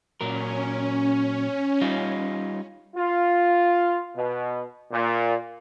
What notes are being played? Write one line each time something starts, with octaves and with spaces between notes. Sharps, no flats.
A#2 F#3 C#4 A#4
G3 D#4 F4
F4
B2
A#2